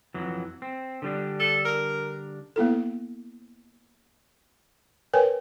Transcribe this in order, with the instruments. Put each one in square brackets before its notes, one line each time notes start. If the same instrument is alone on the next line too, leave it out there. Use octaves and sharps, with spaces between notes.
[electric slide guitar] F2 E3 F#3
C4
D3 G3 D4
[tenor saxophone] A4
A#4
[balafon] A#3 B3 E4 A4
A#4 B4 C#5 G5 G#5